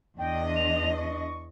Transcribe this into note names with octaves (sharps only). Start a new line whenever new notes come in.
E2 D4 D#5 G5
F7
C#6